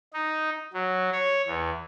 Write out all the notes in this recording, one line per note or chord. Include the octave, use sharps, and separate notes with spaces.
D#4
F#3
C#5
E2